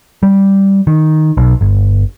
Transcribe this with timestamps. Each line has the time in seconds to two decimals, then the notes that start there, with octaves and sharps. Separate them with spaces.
0.23 G3
0.87 D#3
1.37 B1
1.61 G1